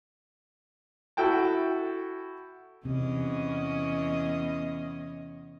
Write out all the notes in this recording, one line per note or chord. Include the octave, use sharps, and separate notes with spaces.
E4 F#4 A4 G5 A5
E2 C3 C#4 D#5